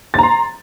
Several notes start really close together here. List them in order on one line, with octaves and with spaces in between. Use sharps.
A6 A#5 C6